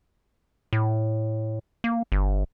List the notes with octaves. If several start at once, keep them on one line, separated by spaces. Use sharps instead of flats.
A2
A#3
G1